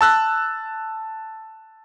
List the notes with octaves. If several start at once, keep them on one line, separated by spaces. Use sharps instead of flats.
A5 E6 F#6